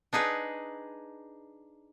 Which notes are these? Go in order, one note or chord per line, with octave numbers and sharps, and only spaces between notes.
D4 D#4 G#4 B4